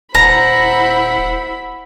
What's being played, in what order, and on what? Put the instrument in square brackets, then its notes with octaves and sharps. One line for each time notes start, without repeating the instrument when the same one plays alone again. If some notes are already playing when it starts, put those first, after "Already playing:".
[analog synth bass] D#1 [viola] E4 B5 [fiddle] C5 F#5 [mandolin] A#5